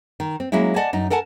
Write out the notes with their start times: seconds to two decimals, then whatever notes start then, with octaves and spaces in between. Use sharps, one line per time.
0.20 D#3
0.40 C4
0.52 F#3 G#3 A#3 C#4 E4
0.76 D5 D#5 F#5 G#5 A5
0.93 F#2 D#4
1.10 A4 A#4 F#5 G#5 A5